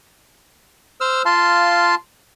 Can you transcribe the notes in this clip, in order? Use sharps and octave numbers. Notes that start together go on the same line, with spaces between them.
C5 E6 F6
F4 F5 A5 C6